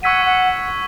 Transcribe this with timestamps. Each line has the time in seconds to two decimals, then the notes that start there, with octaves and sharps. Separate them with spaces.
0.03 F#5 C#6 E6 G#6 B6 D#7
0.26 F#5